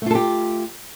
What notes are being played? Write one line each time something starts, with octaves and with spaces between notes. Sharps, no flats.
A3 F4 G4 A4